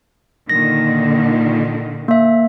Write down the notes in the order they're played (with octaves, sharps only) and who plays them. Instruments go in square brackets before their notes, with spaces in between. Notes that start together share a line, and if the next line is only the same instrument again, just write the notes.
[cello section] A#2 D3 D#3 [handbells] A#6
[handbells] A#3 E5